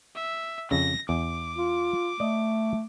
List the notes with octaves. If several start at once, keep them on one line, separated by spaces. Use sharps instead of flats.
E5
F2 C#3 A#6
E2 D6
F4
A3 D5 D#5